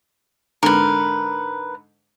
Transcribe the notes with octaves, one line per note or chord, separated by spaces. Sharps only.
G#2 D3 A#4 B4 F6